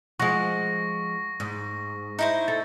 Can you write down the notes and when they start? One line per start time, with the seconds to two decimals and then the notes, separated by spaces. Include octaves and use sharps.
0.19 F3 G#3 F#5 C#6 A#6
1.40 G#2
2.19 D#4 E4 C5
2.48 A4 A6